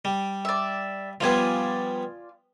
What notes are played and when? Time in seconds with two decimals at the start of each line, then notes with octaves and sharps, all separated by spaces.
0.05 G3
0.45 D5 E5
1.20 F3 G3 B3 F4 D5 G#5